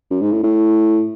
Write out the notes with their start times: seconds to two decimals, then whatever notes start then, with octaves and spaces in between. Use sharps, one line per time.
0.11 F#2
0.22 G#2
0.32 A2
0.43 A2